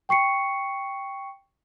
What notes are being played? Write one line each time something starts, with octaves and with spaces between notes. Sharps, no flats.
G5 C#6 C7 C#7